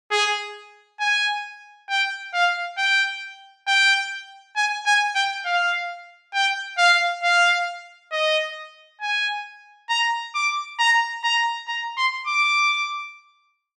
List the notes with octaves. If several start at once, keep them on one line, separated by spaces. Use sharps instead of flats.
G#4
G#5
G5
F5
G5
G5
G#5
G#5
G5
F5
G5
F5
F5
D#5
G#5
A#5
D6
A#5
A#5
A#5
C6
D6